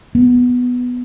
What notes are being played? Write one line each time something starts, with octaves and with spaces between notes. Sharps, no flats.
B3